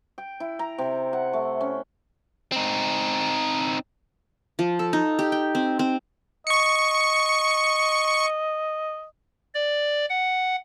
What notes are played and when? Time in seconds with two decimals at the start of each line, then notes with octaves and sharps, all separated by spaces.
0.18 G5
0.40 E4
0.59 A#5
0.78 C3
1.13 F#5
1.33 A3
1.61 C#4
2.52 C4 D#4
4.59 F3
4.79 A4
4.93 D#4
5.19 G4
5.32 G5
5.55 C4
5.79 C4
6.47 D#5 C#6 C#7
9.54 D5
10.10 F#5